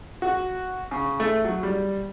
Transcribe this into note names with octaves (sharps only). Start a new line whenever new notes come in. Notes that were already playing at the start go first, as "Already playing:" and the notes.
F#4
C#3
A3
F#3
G3